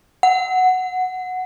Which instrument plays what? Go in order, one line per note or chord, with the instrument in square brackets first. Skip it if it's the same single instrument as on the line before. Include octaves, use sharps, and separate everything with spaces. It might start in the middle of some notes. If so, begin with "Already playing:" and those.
[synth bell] F#5